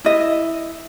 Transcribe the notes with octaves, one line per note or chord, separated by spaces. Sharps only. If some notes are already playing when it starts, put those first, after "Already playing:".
E4 D#5